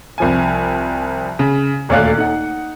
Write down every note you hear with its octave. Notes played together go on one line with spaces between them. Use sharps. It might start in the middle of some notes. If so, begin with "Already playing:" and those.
C2 F3 G#5
C#3
D#1 D2 C#5 D5 F5 F#6
D#4 F#5